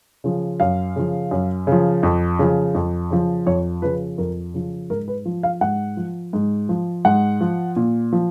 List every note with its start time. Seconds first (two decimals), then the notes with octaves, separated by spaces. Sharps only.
0.24 C#3 F3
0.60 F#2 F5
0.96 C#3 F3
1.31 F#2
1.67 C#3 F3
2.03 F2
2.39 C#3 F3
2.75 F2
3.11 C#3 F3
3.46 F2 C#5
3.82 C#3 F3 B4
4.18 F2 A#4
4.54 C#3 F3
4.90 G#2 A#4
5.08 B4
5.25 F3
5.43 F5
5.61 G#2 F#5
5.97 F3
6.33 G#2
6.69 F3
7.05 G#2 F#5
7.41 F3
7.76 A#2
8.12 F3